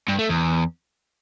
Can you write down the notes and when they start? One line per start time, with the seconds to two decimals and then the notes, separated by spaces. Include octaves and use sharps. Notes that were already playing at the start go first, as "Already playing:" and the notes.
0.09 G2
0.19 A3
0.29 E2